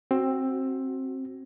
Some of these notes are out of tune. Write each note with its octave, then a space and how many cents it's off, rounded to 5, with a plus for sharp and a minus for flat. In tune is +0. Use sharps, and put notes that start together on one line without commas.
C4 +15 F#4 +10